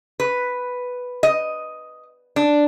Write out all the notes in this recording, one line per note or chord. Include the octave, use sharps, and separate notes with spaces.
B4
D#5
D4